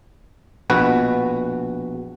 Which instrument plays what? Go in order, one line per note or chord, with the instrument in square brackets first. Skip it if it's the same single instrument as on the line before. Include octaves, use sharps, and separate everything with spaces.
[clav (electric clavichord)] A#1 B2 F#4 B4